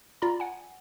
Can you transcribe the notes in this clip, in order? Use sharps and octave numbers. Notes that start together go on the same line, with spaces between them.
F4 D5 A#5 B5
F#5 G#5